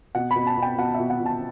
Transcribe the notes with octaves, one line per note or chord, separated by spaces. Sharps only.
B2 F#5
B2 B5
A5
B2
G5
B2 F#5
E5
B2
F#5
B2
A5